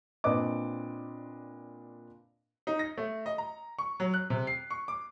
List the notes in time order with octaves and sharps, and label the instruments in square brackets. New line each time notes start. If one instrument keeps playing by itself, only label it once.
[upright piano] A#2 C4 D4 B4 D#5 D6
[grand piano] D#4
A#6
A3
D#5
A#5
C#6
F#3
F#6
C3
C7
C#6
D6